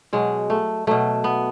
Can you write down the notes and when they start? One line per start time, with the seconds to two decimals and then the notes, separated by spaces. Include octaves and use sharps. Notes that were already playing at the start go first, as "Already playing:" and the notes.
0.13 B2 F#3 G#3
0.50 A3
0.87 B2 F#3 A3
1.24 B3